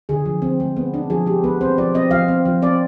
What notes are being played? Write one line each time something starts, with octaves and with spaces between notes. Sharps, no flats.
D3 G#4
F3
C4
G#3
B3
D4
F3 G#4
G#3 G4
B3 B4
C4 C5
F3 D5
C4 D#5
F3 F5
C4
F3
C4 D5